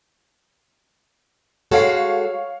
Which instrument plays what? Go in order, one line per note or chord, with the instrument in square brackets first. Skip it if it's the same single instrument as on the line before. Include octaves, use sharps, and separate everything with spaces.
[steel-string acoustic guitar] G#3 F#4 A4 [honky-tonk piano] C#5 F5 C7